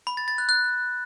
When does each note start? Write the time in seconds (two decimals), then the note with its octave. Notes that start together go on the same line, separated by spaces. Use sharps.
0.07 B5
0.17 A6
0.28 A6
0.38 F#6
0.49 F#6